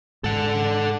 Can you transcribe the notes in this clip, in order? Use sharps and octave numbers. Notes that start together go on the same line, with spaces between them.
G#2 A4 F#5